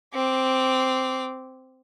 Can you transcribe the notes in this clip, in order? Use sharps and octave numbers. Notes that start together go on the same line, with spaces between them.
C4 D6